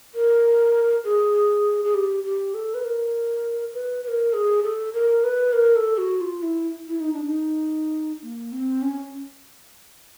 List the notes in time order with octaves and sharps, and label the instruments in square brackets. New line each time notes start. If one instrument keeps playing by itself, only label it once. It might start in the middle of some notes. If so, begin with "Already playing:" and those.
[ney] A#4
G#4
G#4
G4
G4
A4
B4
A#4
B4
B4
A#4
G#4
A4
A#4
B4
A#4
A4
F#4
F4
E4
E4
D#4
D4
D#4
A#3
C4
C#4